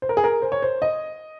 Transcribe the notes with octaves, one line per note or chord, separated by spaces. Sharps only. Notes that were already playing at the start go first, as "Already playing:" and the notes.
C5
A#4
G#4
A#4
C5
C#5
C5
D#5